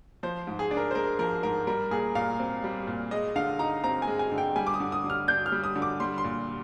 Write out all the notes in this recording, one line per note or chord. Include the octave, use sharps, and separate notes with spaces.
F3 C5
G#2
G#4
D4
A#4
C5
G#3 A#4
F3 A#4
G#2 A#4
G3 A#4
A#2 G#4
A#2 F5
C4
G3
A#2
G#3 D#5
D3 F5
D#4 A#5
C4 A#5
G#5
G#3
G#5
D3
G5
G3 G#5
D6
D#6
D3
D#6
D3
F6
D4 G6
F6
G3
D#6
D3
D6
G3 C6
C6
A#2